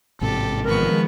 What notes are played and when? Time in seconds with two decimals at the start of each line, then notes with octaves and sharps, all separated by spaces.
0.21 A1 G#2 C3 G4 A4
0.66 D#3 F3 G#3 B3 A#4 C#6